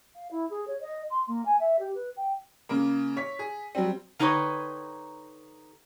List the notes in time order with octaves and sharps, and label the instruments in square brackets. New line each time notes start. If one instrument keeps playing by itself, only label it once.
[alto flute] F5
E4
G#4
C#5
D#5
C6
A#3
G#5
E5
G4
B4
G5
[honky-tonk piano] C#3 A#3
C#5 B6
G#4
F#3 G3 C4
[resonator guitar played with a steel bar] D3 D#4 G4 B4 C#5